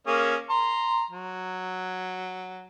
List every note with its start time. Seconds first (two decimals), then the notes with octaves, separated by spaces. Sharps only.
0.07 A#3 C#4 G#4
0.50 A#5 C6
1.10 F#3